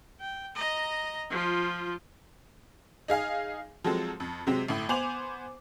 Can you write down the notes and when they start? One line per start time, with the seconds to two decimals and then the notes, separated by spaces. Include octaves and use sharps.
0.21 G5
0.55 D#5 A#5
1.30 F3 F4
3.08 D#4 G#4 F5 G#5
3.84 F3 F#3 G#3 C4 A4
4.20 F2
4.47 C3 F#3 G#3 C4
4.68 G1 A2
4.89 B3 C5 G#5 D6 F7 F#7